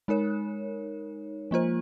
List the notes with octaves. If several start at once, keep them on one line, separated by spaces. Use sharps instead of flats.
G#3 D#4 A#4 C#5
F3 A#3 F4 C5